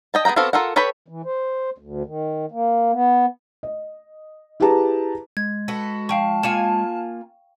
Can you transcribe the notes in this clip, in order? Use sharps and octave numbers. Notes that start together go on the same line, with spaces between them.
D#5 G5 A5
B3 G#4 F#5 G5 A#5
B3 C4 F#4 A4 F5
F4 A4 A#4 F#5
A4 B4 C#5 G5 B5
E3
C5
D2
D#3
A#3
B3
D#5
E4 G4 G#4 B4 A5 A#5
G#3 G#6
F#4 A4 B4
F3 F5 G5 A5 C#6
A#3 F4 G#5 C#7 E7